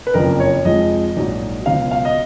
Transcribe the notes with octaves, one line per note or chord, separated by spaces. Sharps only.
B4
F#1 F2 C#3 F3 A#4
C#5
F1 F2 F3 G#3 D#5
A#1 G#2 F#3
C#2 B2 F#3 F5
F5
D#5